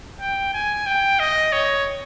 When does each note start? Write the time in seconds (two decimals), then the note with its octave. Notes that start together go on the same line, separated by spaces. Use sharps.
0.21 G5
0.54 G#5
0.86 G5
1.19 D#5
1.53 C#5